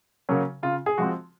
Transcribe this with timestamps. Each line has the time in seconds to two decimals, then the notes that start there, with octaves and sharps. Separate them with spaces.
0.29 C#3 F#3 A#3 C#4
0.63 C#3 F4
0.86 G#4
0.98 F3 G#3 C4 F#4